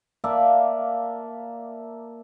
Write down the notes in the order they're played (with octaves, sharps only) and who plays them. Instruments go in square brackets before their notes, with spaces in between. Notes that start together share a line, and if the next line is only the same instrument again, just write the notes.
[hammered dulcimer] A#3 D5 E5 A5